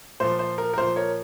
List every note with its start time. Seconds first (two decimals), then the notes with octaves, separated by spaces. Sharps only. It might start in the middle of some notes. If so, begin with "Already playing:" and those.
0.20 A#2 F3 C5
0.39 C5
0.58 A#4
0.74 A#4
0.77 A#2 F3 C5
0.96 A#4 C#5